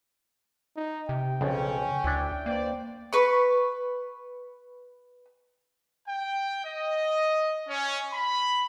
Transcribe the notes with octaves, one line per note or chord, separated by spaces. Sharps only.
D#4
C3 G5
B1 F2 C#3 C#4
D2 D4 E4
A#3 B4 C5 D5
B4 C#6
G5
D#5
C#4
B5